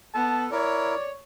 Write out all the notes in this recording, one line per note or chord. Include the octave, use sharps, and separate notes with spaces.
B3 A4 A5
E4 A#4 C#5 D5